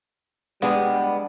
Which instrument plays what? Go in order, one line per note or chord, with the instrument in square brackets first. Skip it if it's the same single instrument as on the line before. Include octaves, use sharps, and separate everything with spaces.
[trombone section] G3 [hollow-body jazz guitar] G#3 D4 G#4 [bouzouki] B3